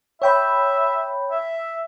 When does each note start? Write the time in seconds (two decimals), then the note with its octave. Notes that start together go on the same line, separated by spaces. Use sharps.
0.22 C#5 E5 G5 B5
1.31 E5